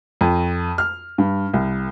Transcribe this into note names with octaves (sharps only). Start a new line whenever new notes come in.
F2
F6
G2
C2